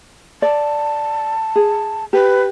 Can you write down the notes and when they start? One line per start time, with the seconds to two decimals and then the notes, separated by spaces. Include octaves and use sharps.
0.42 D5 A5
1.56 G#4
2.13 G4 B4